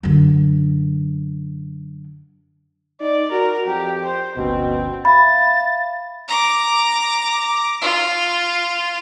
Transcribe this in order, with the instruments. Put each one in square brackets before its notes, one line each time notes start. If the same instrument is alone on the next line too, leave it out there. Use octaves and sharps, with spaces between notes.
[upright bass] F#2 D3
[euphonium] D#4 [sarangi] D5
[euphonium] F#4 [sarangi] A#4
[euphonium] F2 [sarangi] G4
[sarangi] C5
[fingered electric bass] D1 G1 C#4 [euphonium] B2 [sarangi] C4
[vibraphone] E5 F5 A#5 [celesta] B5 [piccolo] A6
[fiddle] A#5 D6
F4